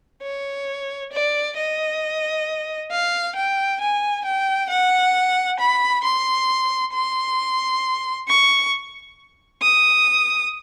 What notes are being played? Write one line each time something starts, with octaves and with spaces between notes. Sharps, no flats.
C#5
D5
D#5
F5
G5
G#5
G5
F#5
B5
C6
C6
C#6
D#6